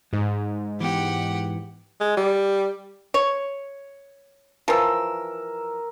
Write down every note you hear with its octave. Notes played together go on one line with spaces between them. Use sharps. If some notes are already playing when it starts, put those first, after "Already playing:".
G#2 G#3
E3 B3 G4 F#5
G#3
G3
C#5
E3 F3 A#4 E6